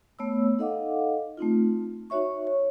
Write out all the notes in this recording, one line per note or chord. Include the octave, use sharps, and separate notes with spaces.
A3 B3 C#5 B5 E6
D#4 A4 D#5 F5 F#5 D6
A3 C4 D#4 F4
D#4 F#4 C#5 E5 C#6
C#5